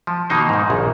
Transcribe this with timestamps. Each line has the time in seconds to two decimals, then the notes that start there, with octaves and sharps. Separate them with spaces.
0.07 F3
0.30 B2 D#3 A#3 D#4 C5
0.49 G#2 D#3
0.70 A#1